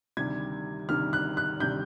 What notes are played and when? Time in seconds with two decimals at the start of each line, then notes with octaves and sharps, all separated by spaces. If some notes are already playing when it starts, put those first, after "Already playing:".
0.17 D2 C3 D#3 G3 G#6
0.89 D2 C3 D#3 G3 F6
1.13 F#6
1.37 F#6
1.60 D2 C3 D#3 G3 G6